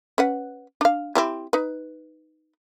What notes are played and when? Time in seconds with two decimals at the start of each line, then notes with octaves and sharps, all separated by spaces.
0.18 C#4 B4 F#5
0.81 D4 F5
1.15 C4 E4 G4
1.53 D#4 B4